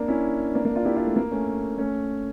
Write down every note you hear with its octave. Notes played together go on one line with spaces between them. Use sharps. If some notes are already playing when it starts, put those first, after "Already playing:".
Already playing: A#3 D4
C#4 E4
A#3 D4
A#3 D4
D4 F4
E4 G4
D4 F4
A3
A#3
A3 C#4
A3 C#4